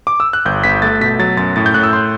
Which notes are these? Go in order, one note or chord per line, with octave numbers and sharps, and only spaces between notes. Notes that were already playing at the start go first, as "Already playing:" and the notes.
D6
E6
F#6
G1 G6
G1 B6
A3 A6
B2 B6
F#3 A6
F#2 A6
A2 A6
G6
A2 F#6
E6
C6